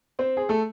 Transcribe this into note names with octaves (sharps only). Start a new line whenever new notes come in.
C4 C5
G#4
A3 A4